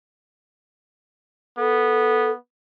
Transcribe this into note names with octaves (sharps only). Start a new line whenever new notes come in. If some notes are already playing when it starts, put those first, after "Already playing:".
B3 A4